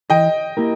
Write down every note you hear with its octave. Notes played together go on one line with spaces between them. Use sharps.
E3 D#5 G5
A#3 E4 G4 A#4